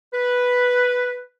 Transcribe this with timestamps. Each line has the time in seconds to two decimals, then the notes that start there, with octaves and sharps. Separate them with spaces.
0.14 B4